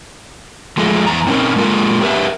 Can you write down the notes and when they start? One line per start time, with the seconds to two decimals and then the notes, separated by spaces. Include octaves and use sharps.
0.77 F3 G#3 A3
1.06 E2 A#5
1.27 C4 C#4 D#4 A#4
1.56 G#3 A#3 F4 A4 A#4
2.01 G4 A#4 B4 E5